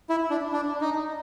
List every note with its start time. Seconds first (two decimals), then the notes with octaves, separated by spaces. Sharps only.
0.10 E4
0.30 D4
0.52 D4
0.81 D#4